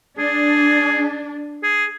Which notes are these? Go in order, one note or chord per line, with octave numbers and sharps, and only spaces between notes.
D4 G#4
G#4